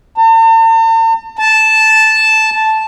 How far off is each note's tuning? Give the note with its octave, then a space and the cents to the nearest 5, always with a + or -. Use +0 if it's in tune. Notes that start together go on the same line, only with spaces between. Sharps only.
A5 +45
A5 -5